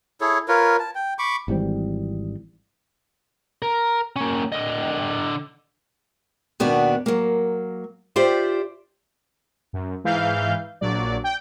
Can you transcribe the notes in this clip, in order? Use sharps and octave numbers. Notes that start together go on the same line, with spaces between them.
E4 G#4 A4 C#5
F4 A#4 B4 C#5
A5
G5
B5 C#6 D6
G#1 E3 G3 C4
A#4
A#3 C#4
D3 D#5
D#2 B2 B3 D4 F#4 D5
F#3 A#3
F4 G4 C5 D5 E5
F#2
G#2 E3 F5 G6
A#1 F#3 D5
G5